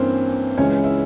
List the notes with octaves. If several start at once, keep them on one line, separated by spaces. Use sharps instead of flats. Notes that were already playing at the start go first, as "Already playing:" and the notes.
Already playing: G2 E3 A#3 C4 C#4 C5
C#2 C#3 E3 G#3 C#4 C#5
E4 E5